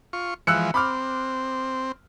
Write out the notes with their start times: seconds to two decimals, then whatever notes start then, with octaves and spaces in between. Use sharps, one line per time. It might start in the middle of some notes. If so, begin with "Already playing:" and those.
0.13 F4 C#6
0.47 E3 F3 G#3 E6 F#6 C#7
0.74 C4 B5 D6 F6